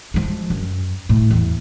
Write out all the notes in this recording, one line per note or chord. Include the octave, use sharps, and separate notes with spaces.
F3 G#3
F#2
A2
E2